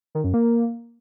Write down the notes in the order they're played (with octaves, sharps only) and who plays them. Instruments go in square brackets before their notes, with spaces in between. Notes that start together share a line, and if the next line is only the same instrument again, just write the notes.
[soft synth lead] D#3
F#2
A#3